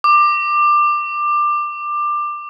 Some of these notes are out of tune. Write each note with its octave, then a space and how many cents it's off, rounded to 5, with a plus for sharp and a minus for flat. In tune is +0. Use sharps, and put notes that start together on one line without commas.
D6 +20